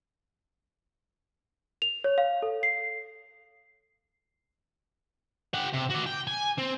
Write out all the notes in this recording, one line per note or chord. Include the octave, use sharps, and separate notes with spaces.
F7
C#5
F5
A4
C7
G4 F#5
C3
F#4 D5
G5
G#5
C4